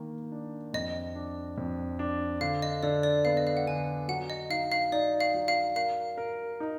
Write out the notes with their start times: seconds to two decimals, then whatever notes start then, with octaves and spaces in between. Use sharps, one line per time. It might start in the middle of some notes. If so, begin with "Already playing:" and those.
Already playing: D#3 A#3
0.32 D4
0.74 F2 D#5
1.15 D4
1.58 F2
1.99 D4
2.41 D3 F5
2.62 D#5
2.83 D3 D5
3.03 D5
3.25 B3 F5
3.37 D#5
3.47 F5
3.57 F#5
3.67 D3 G#5
4.08 F#3 F#5
4.30 D#5
4.50 D#4 F5
4.72 F5
4.92 D#4 D5
5.20 F5
5.34 F#3
5.48 F5
5.76 A#4 F5
6.18 A#4
6.60 D#4